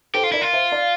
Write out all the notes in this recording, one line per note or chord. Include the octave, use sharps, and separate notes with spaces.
G4 A4 C5
F4
E4 A#4 D5
F4
C5 E5
D5 F5